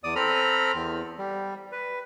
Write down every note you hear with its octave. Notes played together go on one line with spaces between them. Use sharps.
E2 D5 D#6
C4 A4 A#5 B5 F6
E2
G3
B4